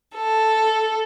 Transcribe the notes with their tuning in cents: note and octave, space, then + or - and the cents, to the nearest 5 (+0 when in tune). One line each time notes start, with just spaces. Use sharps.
A4 +0